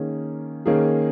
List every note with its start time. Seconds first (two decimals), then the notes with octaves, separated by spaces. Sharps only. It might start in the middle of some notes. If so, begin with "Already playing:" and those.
Already playing: D#3 A#3 C#4 G#4
0.66 D#3 A#3 C#4 G#4